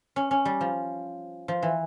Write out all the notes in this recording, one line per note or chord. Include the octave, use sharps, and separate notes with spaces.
C#4
C#4
G3
F3
F3
E3